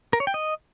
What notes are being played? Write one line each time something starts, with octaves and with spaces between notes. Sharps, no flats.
A#4
C#5
G5
D#5